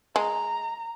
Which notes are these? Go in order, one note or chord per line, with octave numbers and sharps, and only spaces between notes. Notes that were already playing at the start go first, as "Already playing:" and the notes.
G#3 A#5